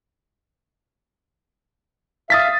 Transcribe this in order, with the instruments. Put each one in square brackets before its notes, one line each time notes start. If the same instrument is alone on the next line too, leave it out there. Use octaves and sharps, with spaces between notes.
[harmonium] E5 F5 [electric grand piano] D#6 A6 B6